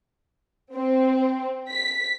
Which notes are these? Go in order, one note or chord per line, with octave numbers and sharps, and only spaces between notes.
C4
B6